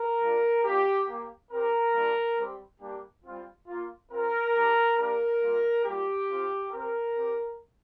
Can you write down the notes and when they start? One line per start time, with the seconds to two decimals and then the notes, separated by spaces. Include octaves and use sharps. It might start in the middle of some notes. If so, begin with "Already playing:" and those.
Already playing: A#4
0.20 G3 D4 F4
0.63 A#3 D4 F4 G4
1.07 A#3 G4
1.50 C4 G4 A#4
1.94 G3 A#3 D4 F4
2.38 G3 C4 G4
2.80 G3 A#3 D4 G4
3.24 G3 C4 F4
3.67 A#3 F4
4.10 C4 F4 A#4
4.54 G3 D4 G4
4.97 A#3 D4 G4 A#4
5.41 G3 A#3 F4
5.84 G3 A#3 F4 G4
6.28 C4 F4
6.70 C4 G4 A#4
7.14 C4 G4